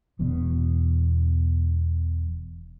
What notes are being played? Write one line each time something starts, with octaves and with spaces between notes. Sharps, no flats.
E1 E2 B2 B3